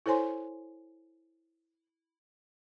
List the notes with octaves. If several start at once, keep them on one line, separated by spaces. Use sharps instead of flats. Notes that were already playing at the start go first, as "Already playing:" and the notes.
E4 A4 C5 C#5 G#5 C6